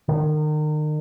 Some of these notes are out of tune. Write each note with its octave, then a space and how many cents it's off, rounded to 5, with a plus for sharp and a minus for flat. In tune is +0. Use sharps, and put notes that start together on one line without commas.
D#3 -35